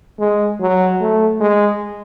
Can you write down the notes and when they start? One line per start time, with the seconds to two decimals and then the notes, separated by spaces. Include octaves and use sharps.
0.19 G#3
0.60 F#3
1.00 A3
1.40 G#3